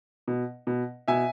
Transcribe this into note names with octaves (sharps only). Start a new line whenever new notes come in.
B2
B2
B2 E5 G#5